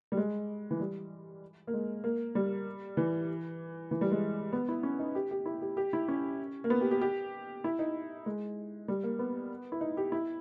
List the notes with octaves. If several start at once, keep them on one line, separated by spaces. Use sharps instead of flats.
G3
G#3
E3
G3
A#3
G#3
A#3
G3
E3
E3
G3
G#3
B3
E4
C#4
D#4
G4
G4
E4
G4
G4
E4
C#4
A#3
B3
G4
G4
G4
E4
D#4
G#3
G3
A#3
B3
E4
D#4
G4
E4